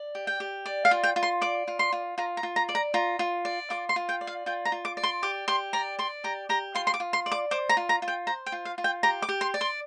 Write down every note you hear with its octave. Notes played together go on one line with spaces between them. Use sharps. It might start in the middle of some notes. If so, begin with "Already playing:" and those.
Already playing: D5
G4
G5
G4
D5
F5
F4
G5
F4
C6
D5 D6
F4
C6
F4
F4 A#5
A#5
F4
A#5
D5
A#5
F4 A#5
F4
D5
F4 D6
C6
F4
G5
D5
F5
F4 G5
A#5
F4
D6
D5
C6
G4 D6
G4 C6
D5 A#5
D5 C6
G4 A#5
G4 A#5
F4 C6
C6
D6
F4
C6
D5
D6
C5 D6
A#5
F4
A#5
F4
G5
C5 A#5
G5
F4
F5
F4
G5
G4 A#5
D6
G4
C6
D5
C6